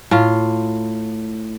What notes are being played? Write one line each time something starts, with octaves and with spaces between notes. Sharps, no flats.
A2 F4